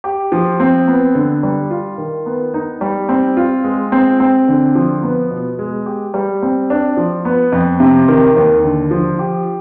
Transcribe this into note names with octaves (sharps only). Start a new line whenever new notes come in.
G4
F3
C4
B3
D3
G3
F4
D#3
B3
D#4
G3
C4
F4
G#3
C4
C4
D3
F3
B3
B2
G#3
G4
G3
C4
D4
F3
B3
F2
C3
D#3
D#2
D3
F3
G4